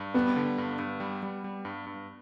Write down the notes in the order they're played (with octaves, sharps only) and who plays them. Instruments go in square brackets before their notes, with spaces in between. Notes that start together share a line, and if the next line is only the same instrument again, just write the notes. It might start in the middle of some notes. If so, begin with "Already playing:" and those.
Already playing: [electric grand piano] G2
[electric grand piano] G3 [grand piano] B3
[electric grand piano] D3
G2
G2
G3
G3
G3
G2
G2